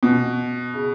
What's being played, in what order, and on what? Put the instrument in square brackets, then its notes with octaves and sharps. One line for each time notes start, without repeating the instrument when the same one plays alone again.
[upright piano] B2
C#3